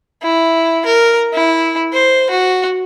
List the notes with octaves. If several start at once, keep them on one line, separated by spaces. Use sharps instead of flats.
E4
A#4
E4
C5
F#4